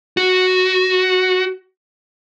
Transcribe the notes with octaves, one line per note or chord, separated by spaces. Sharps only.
F#4